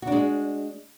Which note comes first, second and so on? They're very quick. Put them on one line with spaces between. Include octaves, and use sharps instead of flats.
F#4 D4 G#3